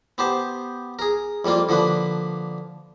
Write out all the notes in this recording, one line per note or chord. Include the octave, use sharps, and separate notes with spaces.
B3 G4 C5 A5
G#4 A#4
F2 G3 A#3 F4
D3 F3 A#3 B4